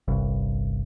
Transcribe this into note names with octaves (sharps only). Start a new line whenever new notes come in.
G1 C2 G2